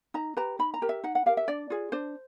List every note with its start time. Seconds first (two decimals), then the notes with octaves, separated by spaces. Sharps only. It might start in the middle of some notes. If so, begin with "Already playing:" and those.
0.14 D#4 A#5
0.37 G4 B4 A#5
0.59 D#4 B5
0.74 A#5
0.82 G4 A#4
0.89 E5
1.04 D#4 F#5
1.15 F#5
1.26 G4 A#4 F5
1.37 E5
1.48 D4 D5
1.70 F4 G#4
1.92 D4 C5